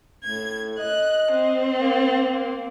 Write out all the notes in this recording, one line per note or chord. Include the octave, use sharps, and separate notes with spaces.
A2 G#6
D#5 F#6
C4
A#3
A#3